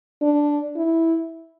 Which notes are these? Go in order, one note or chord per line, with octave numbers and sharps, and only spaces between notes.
D4
E4